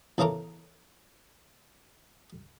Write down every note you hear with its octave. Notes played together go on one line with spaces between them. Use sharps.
E2 C#3 E3 A4 A#4 D6